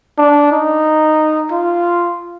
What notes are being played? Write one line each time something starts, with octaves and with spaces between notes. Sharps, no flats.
D4
D#4
F4